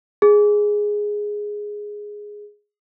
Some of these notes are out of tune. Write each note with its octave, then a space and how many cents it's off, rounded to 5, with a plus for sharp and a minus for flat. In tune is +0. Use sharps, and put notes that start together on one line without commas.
G#4 +0